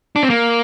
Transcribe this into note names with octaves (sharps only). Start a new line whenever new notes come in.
D4
C4
A#3